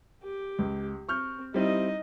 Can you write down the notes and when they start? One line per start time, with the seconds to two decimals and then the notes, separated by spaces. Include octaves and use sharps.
0.23 G4
0.59 C#2
1.09 C4 C#6 F6 G6
1.54 G3 C4 D#4 E4 D#5